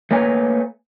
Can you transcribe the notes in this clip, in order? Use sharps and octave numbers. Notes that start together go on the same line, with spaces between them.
A3 A#3 B4 C#5 G#5 A#5